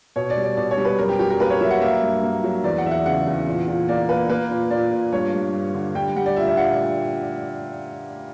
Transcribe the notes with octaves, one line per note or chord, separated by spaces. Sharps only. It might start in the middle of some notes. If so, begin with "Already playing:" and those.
B2 C#5
D5
G3
D5
B2 D5
C#5
G3
B4
F#2 A#4
G4
F#3 G4
A#4
A#3 B4
C#5
F#3 E5
F#5
A#3 E5
G2
A#3
F#3
E2 D5
F#5
E2 E5
F#5
C#3 F#5
E2
A#2
A#2
A#3 D5
A#3 B4
A#3 B4
A#2
A#2 D5
A#2
G2 C#5
G2
G2
D3
G3 G5
G3 F#5
D5
A#2 E5
E5
A#2 F#5